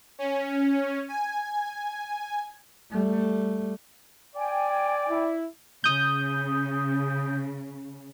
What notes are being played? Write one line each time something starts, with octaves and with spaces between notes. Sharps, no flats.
C#4
G#5
G3 A3
D5 G5 G#5
E4
C#3 D#6 G6